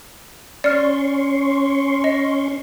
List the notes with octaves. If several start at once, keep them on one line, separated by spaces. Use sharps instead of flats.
C#4 D5 C6 C#6 F6
D#5